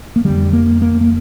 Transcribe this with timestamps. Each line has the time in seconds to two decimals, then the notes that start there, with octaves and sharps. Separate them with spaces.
0.16 A#3
0.25 F2 D3 G3
0.53 A#3
0.82 A#3
1.01 A#3